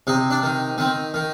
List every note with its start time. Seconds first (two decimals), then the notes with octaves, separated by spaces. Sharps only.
0.07 C3 D#4
0.30 D4
0.43 D#3
0.78 D#3 C4
1.14 D#3